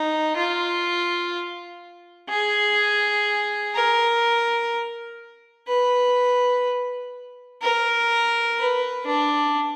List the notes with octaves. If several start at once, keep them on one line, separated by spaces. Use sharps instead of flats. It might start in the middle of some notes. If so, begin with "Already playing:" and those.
Already playing: D#4
F4
G#4
A#4
B4
A#4
B4
D4